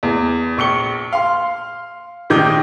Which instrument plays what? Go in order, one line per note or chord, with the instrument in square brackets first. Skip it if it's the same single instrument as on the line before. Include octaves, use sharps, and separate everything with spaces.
[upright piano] E2
A#1 C#6 C#7 G7
F5 C6
A#1 D#3 D#4 D6 G6